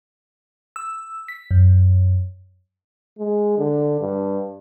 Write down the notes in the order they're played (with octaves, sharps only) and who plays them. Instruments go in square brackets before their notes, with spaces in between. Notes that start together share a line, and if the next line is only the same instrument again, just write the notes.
[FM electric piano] E6
B6
F#2
[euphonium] G#3
D3
G2